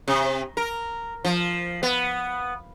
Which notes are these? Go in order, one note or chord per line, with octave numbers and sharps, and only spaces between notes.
C3
A#4
F3
B3